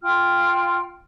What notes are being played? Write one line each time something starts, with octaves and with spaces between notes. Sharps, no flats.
F4 G5 F6